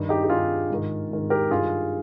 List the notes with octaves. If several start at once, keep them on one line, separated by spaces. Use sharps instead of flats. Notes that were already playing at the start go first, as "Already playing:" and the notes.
Already playing: G2 D#3
D#4 G4
G4
G2 D#3 F4 G#4
G#2 D#3
G#2 D#3
G4 A#4
G2 D#3 F4 G#4